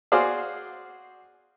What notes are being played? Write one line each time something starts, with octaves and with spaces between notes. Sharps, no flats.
F#4 G#4 C5 D5 F5